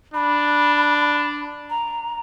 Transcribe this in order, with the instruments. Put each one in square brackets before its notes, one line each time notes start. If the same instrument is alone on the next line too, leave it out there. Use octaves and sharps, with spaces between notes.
[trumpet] D4 [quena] B5
[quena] A#5